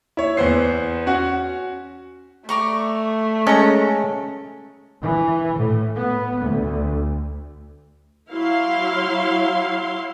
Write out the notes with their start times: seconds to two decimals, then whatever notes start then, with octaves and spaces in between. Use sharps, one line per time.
0.17 E4 C#5
0.37 E2 B3 C4 C5 C7
1.06 C#4 F#4 F#5
2.49 A3 D5 A#5 C#6
3.47 G#3 C#4 A4 A#5
5.03 E3
5.57 A2
5.96 B3
6.42 D2
8.32 F#3 E4 F5 C6